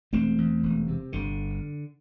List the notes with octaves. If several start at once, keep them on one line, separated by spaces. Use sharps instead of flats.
E1 A3 C4
E2
E1
C3
G1 D3